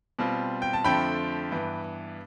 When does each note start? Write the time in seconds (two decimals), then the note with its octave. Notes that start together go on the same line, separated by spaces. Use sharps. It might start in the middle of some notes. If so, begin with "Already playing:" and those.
0.19 B2 G3 C4 F4
0.62 G5
0.73 A5
0.84 F2 D3 F3 A3 C4 G5 B5
1.52 G2 E3 B3